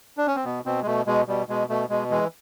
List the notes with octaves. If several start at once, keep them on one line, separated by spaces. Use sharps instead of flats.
D4
C#4
C4
B2 B3
B2 C4
G#3
B2 A3
B2 G#3
B2 G3
B2 G#3
B2 A3
B2 G#3
E3 G#3